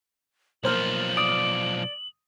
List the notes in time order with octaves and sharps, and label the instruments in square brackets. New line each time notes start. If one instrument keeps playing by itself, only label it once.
[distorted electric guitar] B1 F3 [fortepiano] A#3 C5 F6 [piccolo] F#7
[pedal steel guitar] D5 [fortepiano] D#6